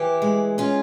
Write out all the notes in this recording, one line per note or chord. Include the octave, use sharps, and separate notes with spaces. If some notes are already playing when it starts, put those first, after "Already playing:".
Already playing: E3 G4
G#3
C#4 F4